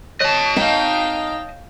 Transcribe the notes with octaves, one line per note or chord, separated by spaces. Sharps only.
C#5 D#5 A5
D#4 F5 G5